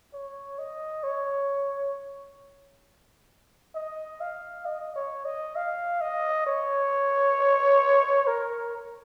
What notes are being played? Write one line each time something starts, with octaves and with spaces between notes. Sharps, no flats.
C#5
D#5
C#5
D#5
F5
D#5
C#5
D#5
F5
D#5
C#5
A#4